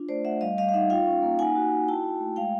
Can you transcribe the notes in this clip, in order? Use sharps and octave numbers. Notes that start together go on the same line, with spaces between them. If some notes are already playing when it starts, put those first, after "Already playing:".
Already playing: D4 F4
A3 C5 D5
A3 E5 F#5
G3 D#5 F5
G3 D#5 F5
F5
D#4 E5 F#5
F4 F5 G5
C#4
A#3
D#4 F#5 G#5
F#4
F#4
E4 G5 A5
E4
A3
G#3 F5 G5